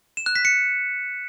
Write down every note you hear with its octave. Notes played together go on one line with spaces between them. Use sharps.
E7
F#6
B6
C#7